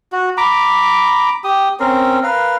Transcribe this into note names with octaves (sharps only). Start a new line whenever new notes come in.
F#4
A#5 B5 D6
G4 D#6
C4 C#4 A#4
A#4 B4 F5